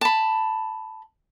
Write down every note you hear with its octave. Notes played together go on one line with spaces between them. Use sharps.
A5 B5